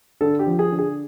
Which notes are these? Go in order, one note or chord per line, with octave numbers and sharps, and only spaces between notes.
D3 A4
G4
F3
G#4
D3
G#4